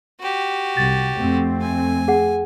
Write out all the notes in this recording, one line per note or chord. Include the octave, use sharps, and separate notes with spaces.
F#4 G4
C2 A6
F2 A3 C4
G#5
G#4 F#5